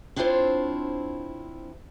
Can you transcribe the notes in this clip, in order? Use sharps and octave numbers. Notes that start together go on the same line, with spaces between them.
C4 D4 E4 F4 C5 C#5